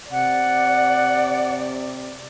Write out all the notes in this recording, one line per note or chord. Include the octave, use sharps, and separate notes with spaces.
C3 D5 F#5